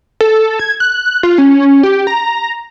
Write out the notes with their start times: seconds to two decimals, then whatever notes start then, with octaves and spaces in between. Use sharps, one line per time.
0.21 A4
0.59 G#6
0.80 F#6
1.23 F4
1.38 C#4
1.83 G4
2.07 A#5